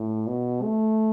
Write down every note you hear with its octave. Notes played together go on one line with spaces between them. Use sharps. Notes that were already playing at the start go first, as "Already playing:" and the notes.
Already playing: A2
B2
A3